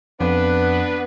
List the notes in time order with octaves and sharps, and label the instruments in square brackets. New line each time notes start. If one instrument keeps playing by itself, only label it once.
[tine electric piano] F2 [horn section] B3 D4 B4